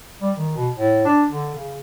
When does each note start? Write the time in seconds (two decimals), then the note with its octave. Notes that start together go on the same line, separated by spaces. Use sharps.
0.22 G3
0.36 D#3
0.56 B2
0.75 A2
1.05 D4
1.30 D3
1.54 C#3